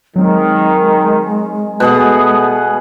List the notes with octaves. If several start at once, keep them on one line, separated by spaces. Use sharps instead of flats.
D#3 F#3 G#3 C4
B2 A3 B3 G#4 F#5 F#6